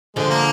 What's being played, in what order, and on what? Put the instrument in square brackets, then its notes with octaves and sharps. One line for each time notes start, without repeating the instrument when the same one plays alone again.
[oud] D3 F3 [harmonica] G#3
[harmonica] A#3